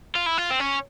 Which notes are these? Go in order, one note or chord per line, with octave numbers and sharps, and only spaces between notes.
F4
E4
F4
C4
C#4